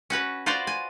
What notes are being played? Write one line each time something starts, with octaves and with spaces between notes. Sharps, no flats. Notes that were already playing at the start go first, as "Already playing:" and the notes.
C#4 F#4 B4 C#5
F4 F#4 B4 C5 D5 F5
G#5